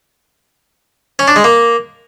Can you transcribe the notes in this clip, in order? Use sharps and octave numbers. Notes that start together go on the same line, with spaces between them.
C#4
D4
G#3
A#3